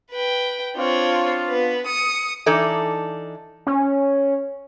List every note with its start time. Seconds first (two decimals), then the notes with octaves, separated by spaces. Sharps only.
0.11 B4 G5
0.76 C4 D4 F4 C#5
1.48 B3 B4
1.86 D#6 C#7
2.46 E3 D4 D#4 A4
3.67 C#4